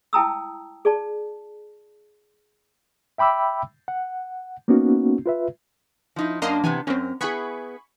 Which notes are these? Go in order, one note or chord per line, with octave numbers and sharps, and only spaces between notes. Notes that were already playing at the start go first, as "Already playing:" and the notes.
E4 G5 A5 A#5 D#6 E6
G#4 D5 A5
E5 G5 B5 D6 E6
F#5
A#3 B3 C#4 D#4 F#4
F4 B4 E5
F3 D#4 E4
F#2 A#3 D4 D#5 A#5 C6
C3 E3 B3 G#5
F#2 C4 C#4 A#4
B3 E4 G#4 G#5 B5 C#6